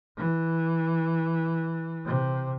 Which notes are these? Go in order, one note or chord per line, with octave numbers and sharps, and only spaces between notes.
E3
C3